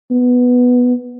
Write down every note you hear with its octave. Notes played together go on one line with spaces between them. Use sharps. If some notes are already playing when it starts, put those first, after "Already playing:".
B3